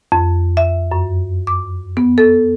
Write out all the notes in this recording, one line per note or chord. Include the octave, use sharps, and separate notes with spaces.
F2
E5
F#2
D6
B3
A4